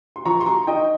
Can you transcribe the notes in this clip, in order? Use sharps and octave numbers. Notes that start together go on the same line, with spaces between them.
C6
F3 A#5 C#6
C6
A#5 C#6
D#4 D#5 G5